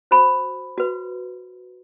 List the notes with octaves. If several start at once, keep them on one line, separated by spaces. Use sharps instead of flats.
F#4 C5 B5
F#4 B4